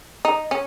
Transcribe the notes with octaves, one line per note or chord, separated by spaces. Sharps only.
D#4
C#4